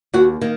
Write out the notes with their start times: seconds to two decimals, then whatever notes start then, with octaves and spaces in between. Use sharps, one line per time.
0.14 D#2 F#4
0.41 D#3 A#3